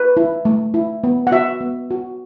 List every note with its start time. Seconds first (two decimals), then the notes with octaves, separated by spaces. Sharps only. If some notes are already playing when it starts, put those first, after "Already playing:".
Already playing: B4
0.17 E4
0.45 A3
0.74 E4
1.04 B3
1.27 F#5
1.32 F#4 E5
1.61 B3
1.91 F#4